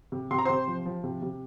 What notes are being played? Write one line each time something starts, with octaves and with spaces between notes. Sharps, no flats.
C3
C3 C6
A#5
C3 C5 C6
F3
F3
C3
C3